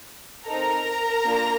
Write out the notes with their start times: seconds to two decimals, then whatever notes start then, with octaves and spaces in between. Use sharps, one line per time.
0.47 C4 D#4 A4 A#4 A#5
1.24 A#3 D4 F4